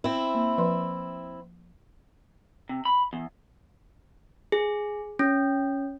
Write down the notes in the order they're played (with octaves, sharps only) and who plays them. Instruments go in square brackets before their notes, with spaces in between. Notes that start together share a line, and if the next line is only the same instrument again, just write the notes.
[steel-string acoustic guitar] C4 E4
[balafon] A#3
F3 B4 C6
[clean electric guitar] C3
B5
E2
[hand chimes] G#4
C#4